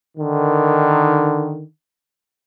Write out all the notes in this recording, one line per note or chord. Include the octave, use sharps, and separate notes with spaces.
D3 D#3